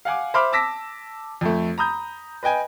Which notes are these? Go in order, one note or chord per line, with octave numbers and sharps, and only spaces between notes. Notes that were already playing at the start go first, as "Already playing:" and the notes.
F5 F#5 G#5 D6
C5 E5 B5 C6 D6 F6
A5 D6 E6 A#6 B6
F2 A3
A#5 B5 D#6 G6
B4 D#5 G5 G#5